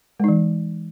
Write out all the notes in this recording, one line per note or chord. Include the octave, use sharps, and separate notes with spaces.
E3 G#3 D#4